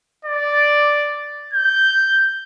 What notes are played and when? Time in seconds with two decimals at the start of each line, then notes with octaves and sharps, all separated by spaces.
0.25 D5
1.54 G6